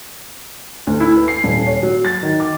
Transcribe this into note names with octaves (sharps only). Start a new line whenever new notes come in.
D2
E4
B4
C7
D#1
C#5
F#3
A6
D#3
D6